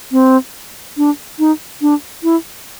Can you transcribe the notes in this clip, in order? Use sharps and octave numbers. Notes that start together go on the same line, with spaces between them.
C4
D4
D#4
D4
E4